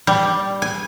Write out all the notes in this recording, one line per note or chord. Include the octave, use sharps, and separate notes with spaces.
G3
G#5